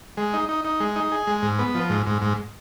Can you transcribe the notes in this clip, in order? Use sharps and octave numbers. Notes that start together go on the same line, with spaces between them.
G#3
D#4
D#4
D#4
G#3
D#4
G#4
G#3
G#2
B3
F3
G#2
G#2
G#2